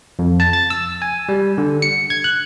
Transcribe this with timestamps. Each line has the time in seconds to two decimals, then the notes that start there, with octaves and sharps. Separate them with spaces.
0.19 F2
0.40 A5
0.53 A6
0.70 E6
1.02 G#5
1.29 G3
1.58 D3
1.82 C#7
2.10 G#6
2.24 F#6